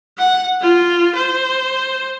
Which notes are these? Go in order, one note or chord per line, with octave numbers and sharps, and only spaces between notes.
F#5
F4
C5